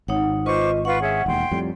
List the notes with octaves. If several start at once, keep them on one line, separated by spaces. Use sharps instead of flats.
G#1 D#4 C#5 F#5
F4 B4 C5 D#5 C#6 D6
F4 B4 F#5 C#6
C#4 G#4 E5
E1 D#2 G5 C6
F2 A2 G3